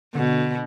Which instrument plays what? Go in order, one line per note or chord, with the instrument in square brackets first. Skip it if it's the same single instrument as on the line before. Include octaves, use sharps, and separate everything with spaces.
[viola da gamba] B2 [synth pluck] D3